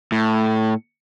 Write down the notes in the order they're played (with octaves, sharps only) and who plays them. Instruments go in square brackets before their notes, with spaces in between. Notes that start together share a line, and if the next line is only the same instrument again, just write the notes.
[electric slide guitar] A2